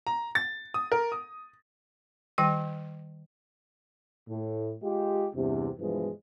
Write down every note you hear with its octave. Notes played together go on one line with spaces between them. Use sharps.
A#5
A6
D#6
A#4
D#6
D#3 G3 G5
A2
G#3 F4 G4
E2 G2 C3
G2 B2 E3 F3 G#3